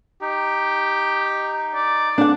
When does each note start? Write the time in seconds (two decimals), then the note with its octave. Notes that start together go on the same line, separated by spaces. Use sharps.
0.21 D#4 G4
1.74 D5
2.18 D4 F#5